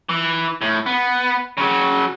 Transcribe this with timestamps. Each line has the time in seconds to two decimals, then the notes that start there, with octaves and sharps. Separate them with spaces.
0.09 E3
0.61 A2
0.86 B3
1.58 C#3 F#3